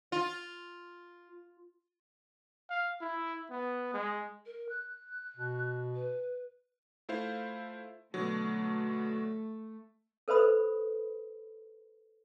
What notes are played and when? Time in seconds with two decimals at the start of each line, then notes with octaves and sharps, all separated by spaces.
0.12 F4
2.70 F5
3.01 E4
3.51 B3
3.94 G#3
4.46 A#4
4.69 F#6
5.37 B2
5.96 B4
7.09 A3 E4 F4 C5 F5
8.14 B2 D3 F#3 A3
10.28 A4 B4 C5 D#5 B5 D#6